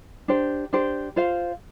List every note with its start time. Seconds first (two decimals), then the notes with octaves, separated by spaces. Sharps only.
0.28 D4 G4 C5
0.73 D4 G4 C5
1.16 F4 C5 F5